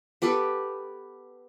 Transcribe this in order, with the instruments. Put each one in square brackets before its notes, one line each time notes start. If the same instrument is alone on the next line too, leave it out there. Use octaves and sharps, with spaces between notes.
[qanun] B3 G4 A4 B4